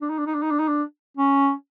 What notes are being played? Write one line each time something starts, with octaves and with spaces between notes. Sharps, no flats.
D4
D#4
D4
D#4
D4
D#4
D4
D#4
D4
C#4